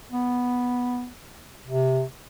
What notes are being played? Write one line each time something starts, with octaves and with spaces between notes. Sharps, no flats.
B3
C3